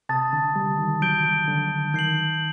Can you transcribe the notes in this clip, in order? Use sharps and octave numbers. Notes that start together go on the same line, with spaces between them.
C3 A5 D#6 A6
D3
G3
D#3
F#3 G6 D7 G7
D3
D#3 G6 C7 F#7